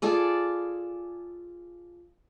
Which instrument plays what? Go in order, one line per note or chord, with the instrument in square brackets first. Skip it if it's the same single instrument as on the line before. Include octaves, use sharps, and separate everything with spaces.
[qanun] F4 G#4 A4 D5